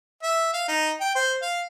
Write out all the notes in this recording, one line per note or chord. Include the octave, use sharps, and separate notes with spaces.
E5
F5
D#4
G5
C5
F5